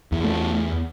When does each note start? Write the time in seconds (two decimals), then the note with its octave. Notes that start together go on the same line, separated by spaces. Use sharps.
0.12 E2
0.24 A3